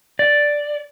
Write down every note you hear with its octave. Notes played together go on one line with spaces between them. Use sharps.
D5